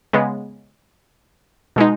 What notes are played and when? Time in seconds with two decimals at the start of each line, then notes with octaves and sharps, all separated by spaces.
0.13 C#3 G#3 B3
1.76 B2 G#3 D#4